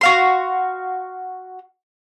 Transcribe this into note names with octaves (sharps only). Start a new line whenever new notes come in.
F#4 F5 C6